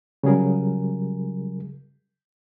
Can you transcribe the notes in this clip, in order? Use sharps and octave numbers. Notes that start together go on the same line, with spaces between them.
C#3 F#3 G3 G#4 A#4